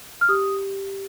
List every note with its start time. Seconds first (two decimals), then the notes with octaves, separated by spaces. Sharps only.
0.21 F6
0.29 G4 D#6